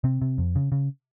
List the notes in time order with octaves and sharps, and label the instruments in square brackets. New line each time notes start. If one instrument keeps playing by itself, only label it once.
[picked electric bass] C3 C4
C3
F2
C#3
C#3